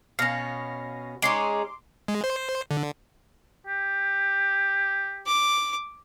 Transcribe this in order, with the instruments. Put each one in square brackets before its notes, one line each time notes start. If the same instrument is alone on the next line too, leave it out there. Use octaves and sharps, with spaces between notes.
[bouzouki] B2 C#4 [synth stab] F5 A#6
[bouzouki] G#3 C#4 D#4 [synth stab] C6 D6
[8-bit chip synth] G#3
C5
D3
[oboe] G4
[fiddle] D6